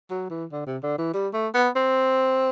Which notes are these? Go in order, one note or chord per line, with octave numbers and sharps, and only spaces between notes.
F#3
E3
D3
C3
D3
E3
G3
A3
B3
C4